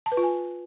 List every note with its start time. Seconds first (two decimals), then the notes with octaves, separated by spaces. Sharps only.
0.06 A5
0.12 B4
0.17 F4
0.23 G#5